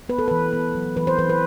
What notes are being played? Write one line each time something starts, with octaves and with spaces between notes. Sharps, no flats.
B3 B4
A4
E3 B4
B3
F#3
E3 B4
C5
E3 B4
B4